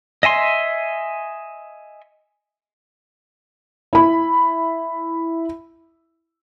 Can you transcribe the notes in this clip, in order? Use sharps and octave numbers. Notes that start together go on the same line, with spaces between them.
D#5 E5 G#5 C6
E4 B5